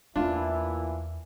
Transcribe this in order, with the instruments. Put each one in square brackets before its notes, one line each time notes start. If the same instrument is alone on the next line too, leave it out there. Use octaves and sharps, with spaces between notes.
[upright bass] E2 A3 [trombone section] A#2 E3 E4 [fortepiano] D4 F4